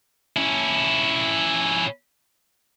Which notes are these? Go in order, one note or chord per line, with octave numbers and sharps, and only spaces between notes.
C#4 E4